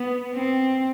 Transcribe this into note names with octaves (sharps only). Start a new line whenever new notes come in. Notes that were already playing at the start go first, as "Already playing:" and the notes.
Already playing: B3
C4